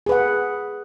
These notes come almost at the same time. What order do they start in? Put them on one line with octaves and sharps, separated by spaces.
G#4 B4 F#5